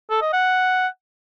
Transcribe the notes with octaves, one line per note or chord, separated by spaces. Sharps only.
A4
D#5
F#5